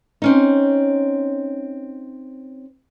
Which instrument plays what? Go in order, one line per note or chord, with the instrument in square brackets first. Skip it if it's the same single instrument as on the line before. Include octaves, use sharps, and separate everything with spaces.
[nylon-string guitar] C4 C#4 D#4